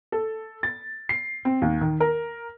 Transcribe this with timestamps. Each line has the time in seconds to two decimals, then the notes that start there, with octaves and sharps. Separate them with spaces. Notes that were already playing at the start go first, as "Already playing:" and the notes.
0.12 A4
0.63 A6
1.09 C7
1.45 C4
1.62 D#2
1.81 D#3
2.00 A#4